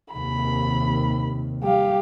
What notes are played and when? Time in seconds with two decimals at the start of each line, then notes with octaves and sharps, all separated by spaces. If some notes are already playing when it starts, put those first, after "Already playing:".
0.13 D#2 C3 D#3 B5
1.63 G3 G4 F5